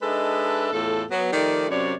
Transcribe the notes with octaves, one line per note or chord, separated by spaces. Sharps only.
G#3 D4 D#4 A4 B4 E5
E2 A2 F4 A4
F#3 B3
D#3 F3 A3 D#4 G4 D5
F#2 C3 C#5 D5